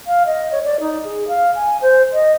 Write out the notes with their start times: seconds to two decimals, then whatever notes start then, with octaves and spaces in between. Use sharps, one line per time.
0.07 F5
0.26 D#5
0.52 C#5
0.65 D5
0.80 D#4
1.04 G#4
1.28 F5
1.55 G#5
1.82 C5
2.13 D#5